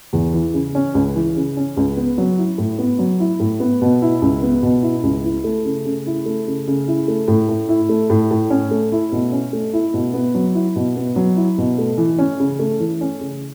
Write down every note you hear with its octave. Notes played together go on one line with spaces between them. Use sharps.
E2
E3
C#3
C#4
C#2
E3
C#3
C#4
C#2
B3
F#3
E4
A2
B3
F#3
E4
A2
B3
B2
E4
C#2
B3
B2
E4
C#2
E4
A3
C#3
C#3
E4
A3
C#3
C#3
E4
A3
A2
A2
E4
A3
A2
A2
C#4
A3
E4
B2
C#4
A3
E4
B2
B3
F#3
E4
B2
B3
F#3
E4
B2
A3
E3
C#4
C#3
A3
E3
C#4
C#3